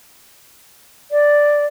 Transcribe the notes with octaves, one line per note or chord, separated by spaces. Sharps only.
D5